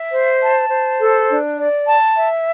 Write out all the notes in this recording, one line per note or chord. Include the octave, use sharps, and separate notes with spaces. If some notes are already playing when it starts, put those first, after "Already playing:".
Already playing: E5
C5
A5
C5
A4
D4
D5
A5
E5